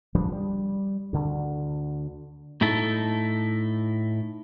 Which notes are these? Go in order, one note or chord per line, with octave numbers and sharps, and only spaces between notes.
D1 F3 G3 D4
G3
D2 D3
A2 D#4 E4 A4